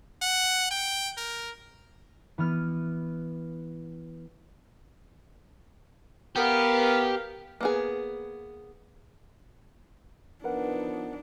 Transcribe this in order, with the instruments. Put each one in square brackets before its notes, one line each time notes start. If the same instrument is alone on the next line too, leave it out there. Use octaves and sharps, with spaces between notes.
[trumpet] F#5
G5
A#4
[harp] E3 B3 F6
[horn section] B3 [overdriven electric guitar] G4 [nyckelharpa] A#4 F5
[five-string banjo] A#3 B3 G#4
[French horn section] F3 B3 [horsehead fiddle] D4 D#4 [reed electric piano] A#4 B4 F#5